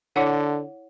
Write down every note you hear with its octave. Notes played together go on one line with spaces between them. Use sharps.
D3 E4 C#5 F#5